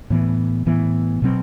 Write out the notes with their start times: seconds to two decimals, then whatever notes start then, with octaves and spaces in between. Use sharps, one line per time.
0.10 A2 E3 B3
0.66 A2 E3 B3
1.22 B2 F#3 C4